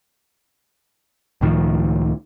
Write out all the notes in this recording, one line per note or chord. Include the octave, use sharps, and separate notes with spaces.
C#2 A2 D#3 F3